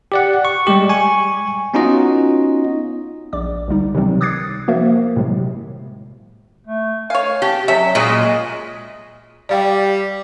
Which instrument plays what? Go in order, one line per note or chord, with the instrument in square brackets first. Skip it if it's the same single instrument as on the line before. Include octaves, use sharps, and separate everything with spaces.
[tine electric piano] G4 D5 F#5
C#6
G3 G#3 G4
G#5 C#6
B3 C#4 D#4 F4 F#4 D#5
[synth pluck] A#1 D5 D6
C#2 D3 G3 D#4
C3 D#3 E3 F#3 G3 C4
D6 D#6 F#6 G#6 A6 C7
F3 A#3 F#4 A#4 C5 E5
A2 C3 D#3 F#3 G#3
[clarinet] A3
[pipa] C#5 F5 [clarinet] G#5
[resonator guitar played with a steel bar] G4 [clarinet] A5
[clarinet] F#3 [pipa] C#4 [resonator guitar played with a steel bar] E5
[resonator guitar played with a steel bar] A#2 F#3 G#3 [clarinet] D#5
[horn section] G3 [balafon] D5 F5 G5